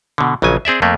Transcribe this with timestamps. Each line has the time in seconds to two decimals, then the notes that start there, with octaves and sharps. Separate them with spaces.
0.18 B2 D3
0.42 A#1 C#3 F#3 G#5
0.65 C4 G#4 D5 E5
0.82 F2 A3 A#3